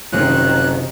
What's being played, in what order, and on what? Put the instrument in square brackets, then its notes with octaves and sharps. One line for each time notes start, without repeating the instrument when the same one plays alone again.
[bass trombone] F#1 [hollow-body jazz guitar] C3 F3 C#4 [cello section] D#3 [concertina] F#6